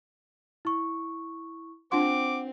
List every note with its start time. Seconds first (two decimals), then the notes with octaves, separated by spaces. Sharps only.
0.65 E4 C#6
1.92 C4 D4 F4 F#5 C6 D6